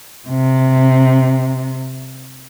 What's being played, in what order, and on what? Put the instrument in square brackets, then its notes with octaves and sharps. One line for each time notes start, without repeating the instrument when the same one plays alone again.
[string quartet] C3